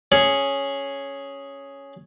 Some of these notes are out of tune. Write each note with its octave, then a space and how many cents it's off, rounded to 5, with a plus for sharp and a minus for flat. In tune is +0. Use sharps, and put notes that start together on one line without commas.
C#4 +0 G#4 +0 C#5 +0